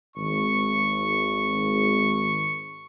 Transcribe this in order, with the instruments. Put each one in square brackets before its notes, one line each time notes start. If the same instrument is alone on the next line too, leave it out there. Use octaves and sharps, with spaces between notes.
[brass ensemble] G#1 [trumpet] C#6